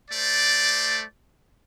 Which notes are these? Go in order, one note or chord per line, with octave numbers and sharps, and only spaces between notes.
A3 C5 D5